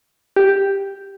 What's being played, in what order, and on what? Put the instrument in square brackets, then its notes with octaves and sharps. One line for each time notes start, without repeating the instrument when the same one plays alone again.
[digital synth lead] G4